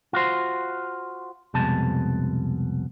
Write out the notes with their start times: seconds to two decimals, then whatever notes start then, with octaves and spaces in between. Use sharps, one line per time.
0.13 F4 F#4 C5
1.54 C2 F2 B2 G#3 A5